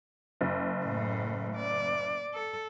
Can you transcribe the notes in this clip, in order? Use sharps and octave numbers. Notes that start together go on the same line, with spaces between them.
F#1
A2 A3
D5
A4